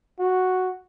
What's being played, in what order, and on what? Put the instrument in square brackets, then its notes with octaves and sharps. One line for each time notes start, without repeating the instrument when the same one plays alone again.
[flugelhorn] F#4